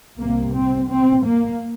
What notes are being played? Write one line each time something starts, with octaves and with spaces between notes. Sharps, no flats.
C2 C3 A#3
C4
C4
A#3